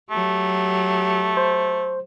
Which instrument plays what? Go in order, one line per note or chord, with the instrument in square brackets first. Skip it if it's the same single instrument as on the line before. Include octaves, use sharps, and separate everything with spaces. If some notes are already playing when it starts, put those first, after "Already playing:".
[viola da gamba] F#3 G4 [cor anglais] A3
[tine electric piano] C5